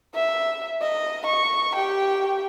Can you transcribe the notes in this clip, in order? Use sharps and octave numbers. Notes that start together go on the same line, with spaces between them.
E5
D#5
C#6
G4 G5